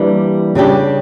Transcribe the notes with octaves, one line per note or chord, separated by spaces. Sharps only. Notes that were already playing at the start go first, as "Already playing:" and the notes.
Already playing: E3 G3 A#3 D4
C#3 G3 D4 G4